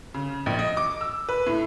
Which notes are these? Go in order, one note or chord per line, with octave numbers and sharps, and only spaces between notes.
C#3
A#1
D#5
D6
E6
B4
A2